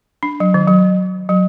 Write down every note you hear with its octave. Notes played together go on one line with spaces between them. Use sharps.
D4
F#3
D#3
F#3
F#3